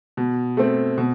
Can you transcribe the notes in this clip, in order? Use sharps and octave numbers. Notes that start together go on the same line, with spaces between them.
B2
A3 C4
B2